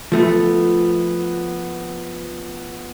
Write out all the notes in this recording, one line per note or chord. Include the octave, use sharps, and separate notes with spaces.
F3 A3 B3